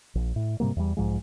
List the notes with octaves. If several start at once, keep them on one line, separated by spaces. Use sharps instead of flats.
A#1
A2
G#2 C3 G3 A#3
E2 G3
B1 G#2 F3 G#3